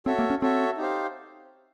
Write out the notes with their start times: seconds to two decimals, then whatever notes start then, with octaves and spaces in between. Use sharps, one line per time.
0.06 C4 F#4 A4 C#5 E5
0.19 A#3
0.30 C#4
0.42 C4 F#4 A4 C#5 E5
0.78 D#4 G4 C5 F5